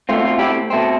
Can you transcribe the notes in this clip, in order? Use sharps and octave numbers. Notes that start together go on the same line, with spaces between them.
B2 A3 C4 F4
F4
E4 G4
B2 A3 C4